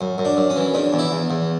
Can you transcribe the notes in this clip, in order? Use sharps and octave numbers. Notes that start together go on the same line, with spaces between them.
F#2
F#2
D4
F#2
C#4
E3
E2 D4
E2
E4
E2
E2